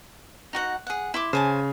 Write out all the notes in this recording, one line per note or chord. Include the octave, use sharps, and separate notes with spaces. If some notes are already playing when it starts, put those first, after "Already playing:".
D#4 F#4 F#5
G#4 F#5
E4 C6 D6
C#3 C5 G#5 A5